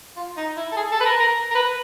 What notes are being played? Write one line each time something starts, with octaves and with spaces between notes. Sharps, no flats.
F4
D#4
E4
A4
G#4
A4
B4
A#4
A#4
A#4
B4